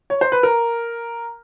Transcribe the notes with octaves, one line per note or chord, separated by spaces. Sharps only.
C#5
C5
B4
A#4